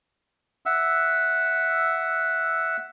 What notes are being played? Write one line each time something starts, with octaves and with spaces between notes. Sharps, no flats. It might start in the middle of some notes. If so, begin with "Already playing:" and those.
E5 F#5 E6